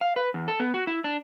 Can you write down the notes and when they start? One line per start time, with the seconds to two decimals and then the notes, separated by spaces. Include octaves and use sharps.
0.01 F5
0.16 B4
0.34 E2
0.48 A4
0.60 B3
0.74 F#4
0.87 E4
1.04 D4